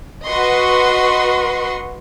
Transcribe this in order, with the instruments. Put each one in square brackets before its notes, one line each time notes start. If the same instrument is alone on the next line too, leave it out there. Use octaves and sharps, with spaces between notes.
[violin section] F#4 B4 D#5 C6 C#6